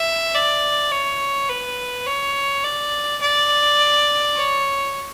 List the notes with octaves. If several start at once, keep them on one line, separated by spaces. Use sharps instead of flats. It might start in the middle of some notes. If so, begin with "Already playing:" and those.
Already playing: E5
D5
C#5
B4
C#5
D5
D5
C#5